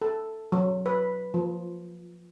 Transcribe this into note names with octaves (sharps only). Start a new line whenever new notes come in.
A4
F#3
B4
F3